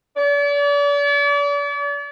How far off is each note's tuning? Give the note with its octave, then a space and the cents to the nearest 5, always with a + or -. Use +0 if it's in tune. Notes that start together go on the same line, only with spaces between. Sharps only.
D5 -40